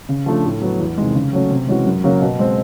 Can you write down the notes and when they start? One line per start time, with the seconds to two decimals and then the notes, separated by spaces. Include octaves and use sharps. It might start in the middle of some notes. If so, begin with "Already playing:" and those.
0.09 C#3
0.26 F3 A3 D4
0.45 A2
0.62 F#3 B3
0.80 E2
0.98 C3 D#3 G#3
1.15 C#3
1.33 F#3 A3 C#4
1.51 C3
1.68 E3 G#3 C#4 F#4
1.86 F#2
2.04 C#3 F#3 A#3 C#4
2.21 B2
2.39 G#3 C4